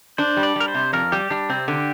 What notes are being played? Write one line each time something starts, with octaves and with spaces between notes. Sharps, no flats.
D4 C5
G3
D5
G3 A#4
C5
C3
F2 A#4
G3 G4
G3 D4
C3 C4
D3 G4